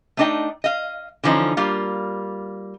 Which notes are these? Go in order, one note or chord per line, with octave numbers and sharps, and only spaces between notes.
A3 B3 D4 D#4 D#5 G5
D#5 F5
D3 E3 F3 C#4 D#4
G3 A#3 F4